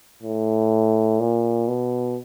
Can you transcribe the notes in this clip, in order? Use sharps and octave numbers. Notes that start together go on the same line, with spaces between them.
A2
A#2
B2